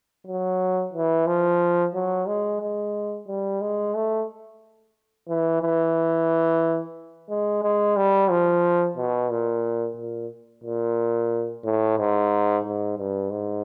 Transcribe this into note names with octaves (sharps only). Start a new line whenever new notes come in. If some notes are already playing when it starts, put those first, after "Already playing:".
F#3
E3
F3
F#3
G#3
G#3
G3
G#3
A3
E3
E3
G#3
G#3
G3
F3
B2
A#2
A#2
A#2
A2
G#2
G#2
G2
G#2